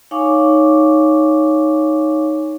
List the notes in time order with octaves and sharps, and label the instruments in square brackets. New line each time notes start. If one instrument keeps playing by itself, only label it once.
[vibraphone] D#4 C#5 F5 G#5 C#6 D6